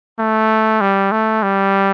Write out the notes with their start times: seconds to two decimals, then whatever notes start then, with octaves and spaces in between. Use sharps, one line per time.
0.19 A3
0.81 G3
1.12 A3
1.43 G3